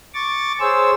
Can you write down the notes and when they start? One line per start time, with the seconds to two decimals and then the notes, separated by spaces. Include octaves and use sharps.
0.14 C#6 D6 A6
0.60 G#4 C5 C#5 E6